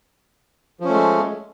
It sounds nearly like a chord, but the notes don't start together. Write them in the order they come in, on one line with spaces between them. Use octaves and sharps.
F3 C#4 A3 G#3